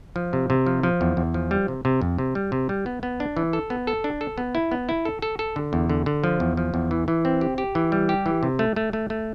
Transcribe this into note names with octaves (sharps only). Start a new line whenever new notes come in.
F3
C3
C3
F3
F3
E2
E2
F3
G3
C3
C3
F2
C3
G3
C3
G3
B3
B3
D4
E3
A4
B3
A4
D4
A4
B3
E4
B3
E4
A4
A4
A4
D3
E2
D3
D3
F3
E2
F3
E2
E3
E3
C4
G4
G4
E3
G3
G4
E3
C3
A3
A3
A3
A3